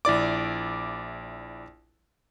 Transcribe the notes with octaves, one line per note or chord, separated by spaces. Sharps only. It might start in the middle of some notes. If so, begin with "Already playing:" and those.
A#1 E4 D5 D6